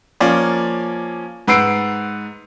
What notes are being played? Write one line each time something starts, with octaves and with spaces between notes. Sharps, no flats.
F3 A#3 C#4 D5
G#2 B4 F#5 E6 C7 D7